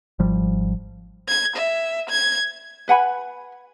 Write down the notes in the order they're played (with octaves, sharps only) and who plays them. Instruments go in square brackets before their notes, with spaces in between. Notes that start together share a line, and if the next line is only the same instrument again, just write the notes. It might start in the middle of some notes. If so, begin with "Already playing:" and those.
[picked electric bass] G#1 F3 G3
[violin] G#6
E5
G#6
[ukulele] B4 F#5 G#5 B5